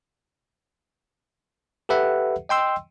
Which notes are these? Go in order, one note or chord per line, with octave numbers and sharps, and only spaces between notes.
G4 A4 B4 E5 F#5
D#5 G5 C6 E6